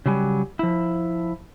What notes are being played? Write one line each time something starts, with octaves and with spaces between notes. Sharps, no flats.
C#3 F#3 G3 G#5
F3 E4